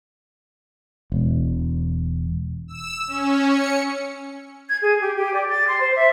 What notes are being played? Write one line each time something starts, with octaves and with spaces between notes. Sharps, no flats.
E1
E6
C#4
C#7
G#6
G#4
G4
G4
D5
A6
C6
C5
E5